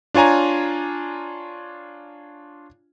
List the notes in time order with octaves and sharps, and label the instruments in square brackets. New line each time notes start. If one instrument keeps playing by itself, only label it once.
[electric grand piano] D4 F4 C#5 G#5 A#5